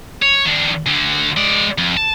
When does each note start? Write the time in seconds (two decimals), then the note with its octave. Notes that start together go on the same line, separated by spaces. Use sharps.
0.22 C#5
0.46 D#3 D4
0.86 D2 D3
1.37 G#3 D5
1.78 F2
1.97 A5